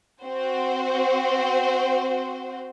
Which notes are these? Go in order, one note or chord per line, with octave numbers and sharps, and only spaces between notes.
C4 F#4 C5